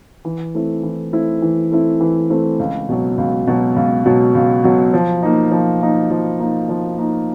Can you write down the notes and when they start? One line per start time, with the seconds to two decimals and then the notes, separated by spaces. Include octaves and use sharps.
0.25 E3
0.54 A3 C4 E4
0.83 E3
1.12 A3 C4 E4
1.42 E3
1.71 A3 C4 E4
2.01 E3
2.30 A3 C4 E4
2.59 C#2
2.89 B2 F#3
3.18 C#2
3.47 B2 F#3
3.76 C#2
4.06 B2 F#3
4.35 C#2
4.64 B2 F#3
4.93 F3
5.22 A#3 D#4
5.51 F3
5.81 A#3 D#4
6.10 F3
6.40 A#3 D#4
6.69 F3
6.98 A#3 D#4